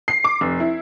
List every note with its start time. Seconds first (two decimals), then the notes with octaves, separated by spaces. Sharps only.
0.08 C7
0.24 D6
0.41 F1
0.60 E4